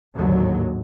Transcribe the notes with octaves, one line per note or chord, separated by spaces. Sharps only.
A1 D#2 G#2 D3 F#3